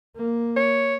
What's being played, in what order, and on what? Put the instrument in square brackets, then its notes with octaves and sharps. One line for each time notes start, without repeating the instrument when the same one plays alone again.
[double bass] A#3
[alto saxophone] C#5